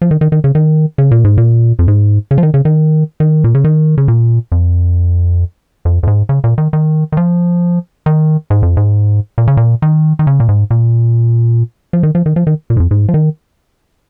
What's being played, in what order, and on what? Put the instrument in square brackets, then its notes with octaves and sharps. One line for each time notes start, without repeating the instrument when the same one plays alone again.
[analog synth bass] F3
D#3
D#3
D#3
C#3
D#3
C#3
A#2
G#2
A#2
F2
G#2
C#3
F3
D#3
C#3
D#3
D#3
A#2
C#3
D#3
C#3
A#2
F2
F2
F2
G#2
C#3
A#2
D#3
D#3
D#3
F3
D#3
G#2
F2
G#2
A#2
C#3
A#2
D#3
D#3
C#3
A#2
G#2
A#2
F3
D#3
F3
D#3
F3
D#3
A#2
G#2
F2
G#2
F3
D#3